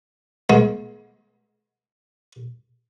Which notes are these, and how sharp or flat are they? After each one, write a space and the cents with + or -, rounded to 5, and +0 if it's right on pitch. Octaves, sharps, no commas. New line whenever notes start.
G#3 +30 B3 -40